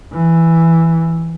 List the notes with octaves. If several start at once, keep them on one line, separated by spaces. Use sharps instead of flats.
E3